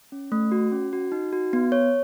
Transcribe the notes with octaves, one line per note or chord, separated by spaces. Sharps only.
C#4
A3
F#4
C#4
F#4
D#4
F#4
B3
C#5